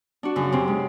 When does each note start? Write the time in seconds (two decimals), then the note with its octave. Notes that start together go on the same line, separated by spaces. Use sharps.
0.23 D4 F#4
0.36 F#2 C#3
0.52 C3 C4
0.68 G#3